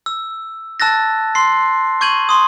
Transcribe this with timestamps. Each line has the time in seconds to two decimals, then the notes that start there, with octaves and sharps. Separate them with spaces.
0.06 E6
0.80 A5 E6 F#6 A6 A#6
1.35 C6 C7
2.01 C#6 G6 G#6 D#7 F#7
2.29 C6 D#6